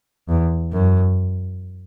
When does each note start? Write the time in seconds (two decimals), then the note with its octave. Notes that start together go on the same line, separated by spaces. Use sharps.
0.29 E2
0.73 F#2